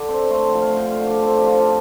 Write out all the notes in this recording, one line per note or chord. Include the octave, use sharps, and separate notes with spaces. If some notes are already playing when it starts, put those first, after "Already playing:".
Already playing: D3 D6
C4
A3 C6
G5
F3
F5
D3 G5
F5
D3
D5
C4 A4
G4
F3
F4